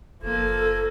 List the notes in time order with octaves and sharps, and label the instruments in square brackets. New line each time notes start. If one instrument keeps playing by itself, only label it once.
[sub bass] F#1 [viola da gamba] F3 A#3 [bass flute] A4 [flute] G#6